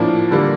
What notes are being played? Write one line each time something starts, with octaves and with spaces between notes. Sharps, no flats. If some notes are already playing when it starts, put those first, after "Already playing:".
Already playing: A2 F3 A#3 D4
D3 G3 A#3